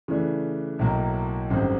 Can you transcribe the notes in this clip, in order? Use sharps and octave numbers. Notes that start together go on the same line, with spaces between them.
C#3 E3 A3 D4
B1 A2 F#3 A#3
G#1 F#2 D3 G3 C4